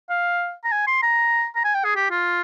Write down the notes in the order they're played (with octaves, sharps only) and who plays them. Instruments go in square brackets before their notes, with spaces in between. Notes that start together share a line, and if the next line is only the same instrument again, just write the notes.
[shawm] F5
A#5
G#5
C6
A#5
A#5
G#5
G5
G#4
G4
F4